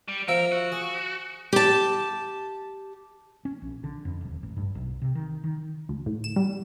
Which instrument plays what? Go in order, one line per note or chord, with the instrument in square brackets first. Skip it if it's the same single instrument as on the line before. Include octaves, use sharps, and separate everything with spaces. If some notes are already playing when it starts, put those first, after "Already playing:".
[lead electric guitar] G3
[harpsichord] F3 E5 [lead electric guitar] A#4
[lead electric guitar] F#4
[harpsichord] G#4
[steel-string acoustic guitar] G4 A5
[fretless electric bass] C#4
A#1
D3
F2
D#1
A1
G2
B1
C3
D#3
D#3
[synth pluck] D2
A2
E7
G3